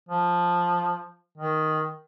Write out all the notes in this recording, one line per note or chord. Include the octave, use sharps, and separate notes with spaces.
F3
D#3